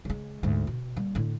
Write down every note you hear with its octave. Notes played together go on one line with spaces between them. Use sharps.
C#3 G#3
D2 G#2
B2
G3 A#3
A2 D3